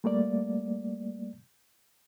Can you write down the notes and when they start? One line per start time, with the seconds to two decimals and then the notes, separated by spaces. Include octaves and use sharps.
0.04 G3 A3 A#3 D5